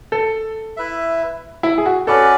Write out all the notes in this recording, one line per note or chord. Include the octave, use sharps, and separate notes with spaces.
A4
E4 B4 E5
E4
G#4
F#4
C#4 F#4 A4 B4 D5